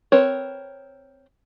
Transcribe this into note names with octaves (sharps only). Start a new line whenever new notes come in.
C4 A#4 B4 C#5